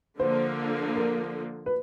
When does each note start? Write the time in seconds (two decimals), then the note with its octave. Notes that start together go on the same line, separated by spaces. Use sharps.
0.19 D3 F3 A#3 C5
0.96 A#4
1.66 B4